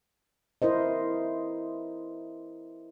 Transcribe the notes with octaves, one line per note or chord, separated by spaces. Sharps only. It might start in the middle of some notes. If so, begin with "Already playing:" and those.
E4 A#4 C5 D#5